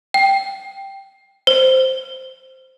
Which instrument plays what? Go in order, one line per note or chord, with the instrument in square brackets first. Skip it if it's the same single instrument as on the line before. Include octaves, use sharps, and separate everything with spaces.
[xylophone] G5
C5